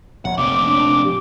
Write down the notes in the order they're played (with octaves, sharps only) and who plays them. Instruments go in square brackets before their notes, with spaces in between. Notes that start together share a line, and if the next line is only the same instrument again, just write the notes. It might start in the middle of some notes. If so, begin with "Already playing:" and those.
[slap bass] A#1 [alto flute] C#5 [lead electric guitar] F#5
[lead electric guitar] F2 C3 [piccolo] D6
[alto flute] D4
G4